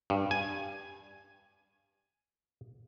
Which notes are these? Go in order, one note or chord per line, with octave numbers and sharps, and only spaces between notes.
G2
G#5